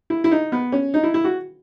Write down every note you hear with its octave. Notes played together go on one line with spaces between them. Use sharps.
E4
E4
D#4
B3
C#4
D#4
E4
E4
F#4